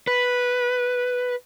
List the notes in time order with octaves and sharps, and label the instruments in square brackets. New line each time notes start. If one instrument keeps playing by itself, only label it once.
[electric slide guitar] B4